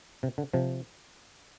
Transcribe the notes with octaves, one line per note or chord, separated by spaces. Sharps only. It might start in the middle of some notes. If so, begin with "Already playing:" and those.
C3
D3
C3 F3